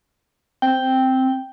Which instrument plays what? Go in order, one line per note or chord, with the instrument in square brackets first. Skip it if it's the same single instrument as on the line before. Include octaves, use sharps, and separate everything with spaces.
[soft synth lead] C4 [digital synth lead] G5